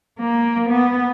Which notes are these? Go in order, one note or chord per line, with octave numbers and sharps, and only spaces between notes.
A#3
B3